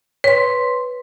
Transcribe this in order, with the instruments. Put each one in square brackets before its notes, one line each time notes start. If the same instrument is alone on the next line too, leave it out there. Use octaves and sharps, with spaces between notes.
[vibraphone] B4 C6 [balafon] C#5